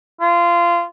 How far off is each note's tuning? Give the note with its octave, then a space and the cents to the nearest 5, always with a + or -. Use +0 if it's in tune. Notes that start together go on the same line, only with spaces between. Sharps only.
F4 -20